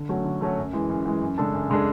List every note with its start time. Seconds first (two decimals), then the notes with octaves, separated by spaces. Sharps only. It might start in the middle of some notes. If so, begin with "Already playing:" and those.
Already playing: D3
0.09 F#3 A3 C#4 F#4
0.25 D3
0.41 F#3 A3 C#4 F#4
0.58 F#2
0.73 E3 G#3
0.90 F#2
1.06 E3 G#3
1.22 F#2
1.38 C#3 G#3 D4 A4
1.54 F#2
1.70 C#3 G#3 D4 A4